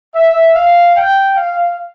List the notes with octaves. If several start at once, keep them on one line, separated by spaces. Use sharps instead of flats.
E5
F5
G5
F5